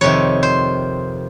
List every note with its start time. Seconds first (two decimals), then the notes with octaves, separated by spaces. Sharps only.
0.01 F2 C3 D#3 C#5
0.43 C5